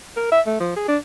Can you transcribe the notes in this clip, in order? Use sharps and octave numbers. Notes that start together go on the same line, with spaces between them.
A#4
E5
A3
F3
G#4
D4